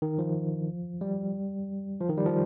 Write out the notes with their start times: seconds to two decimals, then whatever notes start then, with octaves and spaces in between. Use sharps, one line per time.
0.02 D#3
0.19 F3
1.01 G3
2.01 F3
2.09 D#3
2.18 G3
2.26 F3